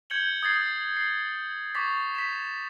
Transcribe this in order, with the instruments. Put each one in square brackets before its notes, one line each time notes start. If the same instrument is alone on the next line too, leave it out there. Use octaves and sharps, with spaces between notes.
[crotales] G6 G#6 C#7 F#7 G7
D#6 G#6 A6 C7
C7
C#6 D6 A6 B6
B6 E7